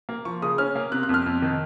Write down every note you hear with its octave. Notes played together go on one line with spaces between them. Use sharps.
A#3
F3 C#6
C#3 D#6
C#4 F6
A#3
C3 F#6
F#6
F2
F6
F2
D#3